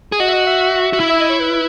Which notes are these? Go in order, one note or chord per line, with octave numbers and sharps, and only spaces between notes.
G#4
F#4 D#5
E5
D#5
E5
F#4
E4
E5
D#5
C#5
B4